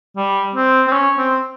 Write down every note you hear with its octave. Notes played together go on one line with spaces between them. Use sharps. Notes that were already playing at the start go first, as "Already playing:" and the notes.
G3
C4
C4
C#4
C4